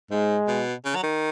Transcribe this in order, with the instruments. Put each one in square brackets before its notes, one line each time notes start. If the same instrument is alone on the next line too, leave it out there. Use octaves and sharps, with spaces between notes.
[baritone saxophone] G#2 [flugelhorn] G#3
[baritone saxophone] B2
C#3
F#3
D#3